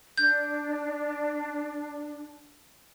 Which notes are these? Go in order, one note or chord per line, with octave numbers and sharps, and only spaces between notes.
D4 G6